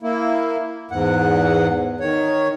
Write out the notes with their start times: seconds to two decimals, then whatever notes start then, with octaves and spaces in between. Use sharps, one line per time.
0.03 A#3 E4
0.91 E2 G#2 F#5
2.00 D#3 C#5